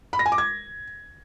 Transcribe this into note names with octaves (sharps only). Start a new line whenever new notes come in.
B5
A#6
G#5
D6
G#6